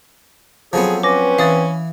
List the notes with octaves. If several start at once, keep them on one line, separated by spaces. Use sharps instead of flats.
F3 F#3 B3 C4 G#4 A4
C4 C#4 B4 D6 A#6
E3 F5 D#6 A6